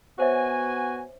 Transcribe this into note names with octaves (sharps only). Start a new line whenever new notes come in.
B3 F#4 C5 C#5 E5 G#5